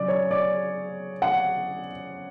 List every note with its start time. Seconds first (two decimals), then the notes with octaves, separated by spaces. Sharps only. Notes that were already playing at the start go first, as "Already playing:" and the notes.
Already playing: C#3 F#3 D5
0.08 C#5
0.31 D5
1.22 F#5